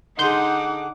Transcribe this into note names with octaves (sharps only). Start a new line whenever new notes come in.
D3 D#4 G#4 F#5 C6 D6 G6